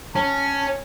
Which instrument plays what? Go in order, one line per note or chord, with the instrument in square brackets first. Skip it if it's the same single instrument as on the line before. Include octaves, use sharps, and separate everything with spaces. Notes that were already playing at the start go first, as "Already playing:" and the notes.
[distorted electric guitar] C#4 [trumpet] A5